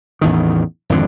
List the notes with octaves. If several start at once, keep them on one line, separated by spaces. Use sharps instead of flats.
A1 E2 D#3
G#1 F2 D3